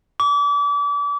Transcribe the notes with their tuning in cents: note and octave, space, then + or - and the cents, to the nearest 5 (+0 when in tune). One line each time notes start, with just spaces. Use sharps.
D6 -35